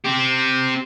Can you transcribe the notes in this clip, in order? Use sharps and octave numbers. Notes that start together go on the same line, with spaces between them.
C4 G4